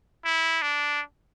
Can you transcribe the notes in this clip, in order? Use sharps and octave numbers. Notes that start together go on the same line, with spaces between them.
E4
D4